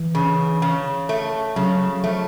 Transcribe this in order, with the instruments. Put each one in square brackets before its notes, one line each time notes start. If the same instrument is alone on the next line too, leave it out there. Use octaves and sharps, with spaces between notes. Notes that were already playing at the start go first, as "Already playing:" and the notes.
Already playing: [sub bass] E3
[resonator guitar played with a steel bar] C#3
C#3
A3
[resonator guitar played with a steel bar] C#3 [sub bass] F#3
[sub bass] F3 [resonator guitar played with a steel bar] A3